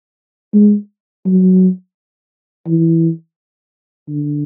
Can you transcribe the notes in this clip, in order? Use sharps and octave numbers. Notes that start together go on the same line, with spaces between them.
G#3
F#3
E3
D3